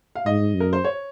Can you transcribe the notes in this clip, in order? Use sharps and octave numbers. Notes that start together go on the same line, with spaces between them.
F5
G#2 D#5
F#2
A#4
C5
C#5